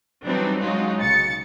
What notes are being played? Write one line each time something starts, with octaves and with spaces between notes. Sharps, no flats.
E3 F#3 G3 C4 D4 D#4
F#3 G#3 C#4 D#4 F4 F#4
B1 C#3 A6 C#7